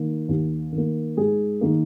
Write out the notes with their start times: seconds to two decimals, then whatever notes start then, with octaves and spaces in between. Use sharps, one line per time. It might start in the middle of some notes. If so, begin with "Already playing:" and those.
Already playing: D#3 A#3
0.29 D#2
0.72 D#3
0.78 A#3
1.17 G#2 G#4
1.61 D#3 A#3